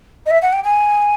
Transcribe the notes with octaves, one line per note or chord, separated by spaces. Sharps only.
D#5
E5
F#5
G5
G#5